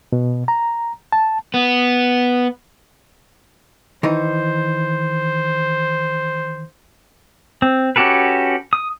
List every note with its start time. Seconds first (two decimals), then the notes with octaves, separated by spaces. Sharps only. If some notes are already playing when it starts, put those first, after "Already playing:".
0.12 B2
0.48 A#5
1.12 A5
1.54 B3
4.03 D#3 E3 D#4 C5
7.62 C4
7.96 C#4 F#4 G4 A4 B4
8.73 D#6